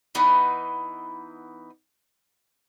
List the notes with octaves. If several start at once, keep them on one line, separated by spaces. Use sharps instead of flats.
E3 B3 D#4 F#5